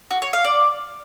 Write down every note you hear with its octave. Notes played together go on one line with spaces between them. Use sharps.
F#4
C#5
F5
D5